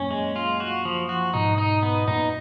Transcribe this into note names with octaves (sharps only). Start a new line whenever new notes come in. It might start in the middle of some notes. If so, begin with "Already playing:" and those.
Already playing: F#2 A#2 C#4
G#3
F4
F#4
F3
F#4
G#2 B2 D#4
D#4
B3
F#2 A#2 D#4